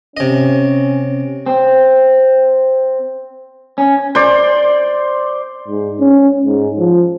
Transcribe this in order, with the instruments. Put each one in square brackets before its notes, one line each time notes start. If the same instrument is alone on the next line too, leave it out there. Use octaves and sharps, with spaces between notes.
[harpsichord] C3 D#5 [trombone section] C#4
[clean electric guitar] C4
C#4
[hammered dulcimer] C5 D5
[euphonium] G#2
C#4
G#2
F3